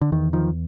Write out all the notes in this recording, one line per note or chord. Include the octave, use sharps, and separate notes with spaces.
D3
E2 D#3
D#3 F3